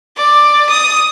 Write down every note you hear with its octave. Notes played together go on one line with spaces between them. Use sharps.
D5
D#6